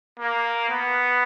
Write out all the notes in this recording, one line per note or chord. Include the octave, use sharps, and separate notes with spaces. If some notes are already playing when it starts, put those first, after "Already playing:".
A#3
B3